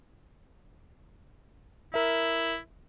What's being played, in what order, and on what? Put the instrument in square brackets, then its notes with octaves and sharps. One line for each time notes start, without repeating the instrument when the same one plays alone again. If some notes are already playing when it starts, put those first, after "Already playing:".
[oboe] E4 [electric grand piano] A#4 E5